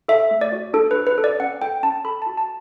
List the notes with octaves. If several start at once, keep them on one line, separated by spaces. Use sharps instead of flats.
A4 E5
A3
D5
F#4
D4 A4
B4
F#4
B4
A4
D5
C#4 F#5
A4 G5
C#4 A5
A4 B5
A5
F#4
A5